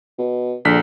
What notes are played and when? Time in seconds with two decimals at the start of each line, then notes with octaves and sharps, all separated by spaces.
0.18 B2
0.65 A#1 D3 B6